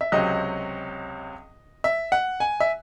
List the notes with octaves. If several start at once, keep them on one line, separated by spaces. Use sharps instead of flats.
E5
C#2 C3 F#3 C4 D#5
E5
F#5
G#5
E5